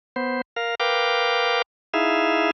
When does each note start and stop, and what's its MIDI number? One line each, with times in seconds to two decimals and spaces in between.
0.16 0.41 59
0.16 0.41 72
0.56 0.75 70
0.56 0.75 77
0.80 1.62 70
0.80 1.62 71
0.80 1.62 77
0.80 1.62 79
0.80 1.62 86
1.94 2.51 63
1.94 2.51 64
1.94 2.51 68
1.94 2.51 76
1.94 2.51 77